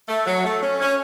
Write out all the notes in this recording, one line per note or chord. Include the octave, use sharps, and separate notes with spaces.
A3
F#3
A3
C#4
C#4